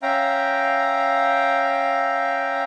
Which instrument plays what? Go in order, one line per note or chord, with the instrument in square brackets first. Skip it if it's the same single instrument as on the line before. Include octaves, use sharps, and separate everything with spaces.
[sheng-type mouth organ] C#4 E5 F5 G5 A#5